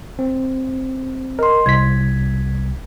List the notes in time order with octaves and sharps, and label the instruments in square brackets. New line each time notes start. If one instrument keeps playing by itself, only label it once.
[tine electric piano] C4
[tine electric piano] A#4 [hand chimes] D#5 C6
[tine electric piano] C2 B6 [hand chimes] G#6